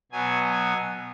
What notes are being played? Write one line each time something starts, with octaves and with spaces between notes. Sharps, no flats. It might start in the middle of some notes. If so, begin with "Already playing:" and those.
B2 F#3 B3 G#5
G#5